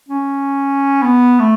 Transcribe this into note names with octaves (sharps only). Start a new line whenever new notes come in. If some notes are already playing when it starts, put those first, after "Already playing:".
C#4
B3
A3